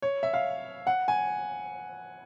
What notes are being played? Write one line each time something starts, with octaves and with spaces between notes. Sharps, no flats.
C#5
E5
F5
F#5
G#5